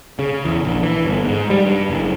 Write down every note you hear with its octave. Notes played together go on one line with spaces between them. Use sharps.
C#3
E2
A#1
E3
G1
G#2
G3
G2
F#1